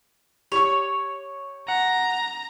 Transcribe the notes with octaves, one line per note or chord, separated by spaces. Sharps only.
G4 C#5 C#6
F#5 A#5